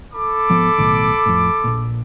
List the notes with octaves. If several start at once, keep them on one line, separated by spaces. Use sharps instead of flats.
A4 B5 D6
G#1 F3 B3
B1 A2 D#3
F2 A2
A#1 A#2